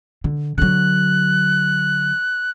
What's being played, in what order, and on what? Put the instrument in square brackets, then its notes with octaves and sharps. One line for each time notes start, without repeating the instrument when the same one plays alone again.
[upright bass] D3
[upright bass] D3 F#3 [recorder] F#6